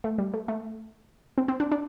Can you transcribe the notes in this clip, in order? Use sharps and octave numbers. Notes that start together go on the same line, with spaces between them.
A3
G3
A3
A3
C4
C4
D4
D4